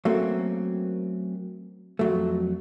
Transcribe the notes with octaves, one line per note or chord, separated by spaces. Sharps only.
F#3 A3 A#3 C4 C#4
F2 F#3 A3